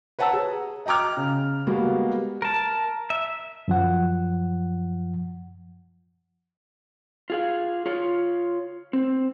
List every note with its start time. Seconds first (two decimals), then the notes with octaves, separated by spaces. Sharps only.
0.19 B4 C#5 F#5 A5 A#5 E6
0.33 G#4
0.86 D#5 G5 A#5 D6 F6
1.17 C#3
1.67 G3 G#3 A#3 B3 F#4
2.42 A#4 A5
3.10 E5
3.68 F#2 F3 F#5
7.30 F4 G#4 F5
7.86 F4 C#5
8.93 C4